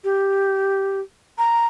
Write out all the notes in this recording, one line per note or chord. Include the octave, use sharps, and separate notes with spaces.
G4
A#5